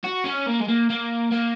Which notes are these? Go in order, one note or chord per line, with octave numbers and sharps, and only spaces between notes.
F#4
C#4
A#3
G#3
A#3
A#3
A#3